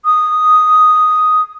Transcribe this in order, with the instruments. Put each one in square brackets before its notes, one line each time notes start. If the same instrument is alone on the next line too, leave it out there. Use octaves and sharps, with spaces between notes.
[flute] D#6